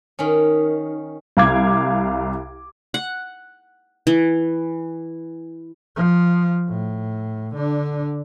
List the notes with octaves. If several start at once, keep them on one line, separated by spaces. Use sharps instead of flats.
D#3 C#4
C2 F5 D6 G#6
F#5
E3
F3
A2
D3 D4